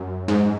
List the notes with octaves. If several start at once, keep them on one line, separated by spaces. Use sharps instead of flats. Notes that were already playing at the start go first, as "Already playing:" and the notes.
Already playing: F#2
G#2